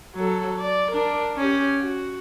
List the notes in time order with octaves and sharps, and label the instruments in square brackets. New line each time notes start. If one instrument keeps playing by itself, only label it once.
[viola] F#3 A4
D5
D4 A#4
C#4 G4
F#4